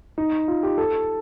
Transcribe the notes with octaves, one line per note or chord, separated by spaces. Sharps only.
D#4
F4
G4
A4